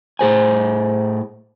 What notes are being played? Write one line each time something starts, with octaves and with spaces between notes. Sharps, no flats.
A2 G#4 C5 G#5